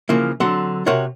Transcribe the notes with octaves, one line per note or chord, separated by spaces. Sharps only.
C#3 E3 F3 A#3
D3 F#3 C4 F#5 C6
C3 F#4 A#4 C#5 F#5